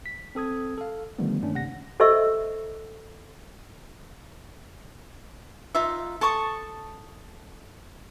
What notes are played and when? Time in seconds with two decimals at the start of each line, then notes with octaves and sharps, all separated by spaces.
0.06 B6
0.35 C4 A4 D#6 G#6
0.78 A4 F5
1.18 D3 D#3 F3 G3 A3 B3
1.42 G2 D#3 A3 A#3 C#4 D4
1.54 C3 F#5 A#6
2.00 A4 C5 D#5 E5 C#6 E6
5.75 D#4 F4 E5
6.21 A4 A5 C#6 D#6